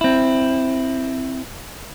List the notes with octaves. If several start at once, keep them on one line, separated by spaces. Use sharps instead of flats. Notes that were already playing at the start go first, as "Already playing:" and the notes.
C4 E4